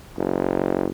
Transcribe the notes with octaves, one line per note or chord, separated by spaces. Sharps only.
F#1